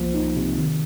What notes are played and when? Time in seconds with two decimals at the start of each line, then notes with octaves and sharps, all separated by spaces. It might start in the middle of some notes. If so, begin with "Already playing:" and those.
Already playing: C2 F3 A#3
0.14 D#4
0.36 C3
0.57 D#3